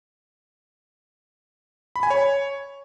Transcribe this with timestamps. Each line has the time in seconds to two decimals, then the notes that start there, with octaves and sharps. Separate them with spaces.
1.96 B5
2.03 G#5
2.10 C#5